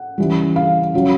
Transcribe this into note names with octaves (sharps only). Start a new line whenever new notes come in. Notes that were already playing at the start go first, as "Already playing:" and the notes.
Already playing: F#5
C#3 E3 G3
F5
C#3 F#3